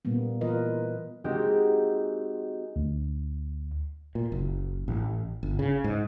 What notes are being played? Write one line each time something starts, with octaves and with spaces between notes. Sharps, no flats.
A#2 G3 A#3 B3
E3 F4 A#4 B4 D#5
G#3 A#3 C4 D#4 F#4 G4
D2
A#2
F#1
A1
G1
C#3
G#2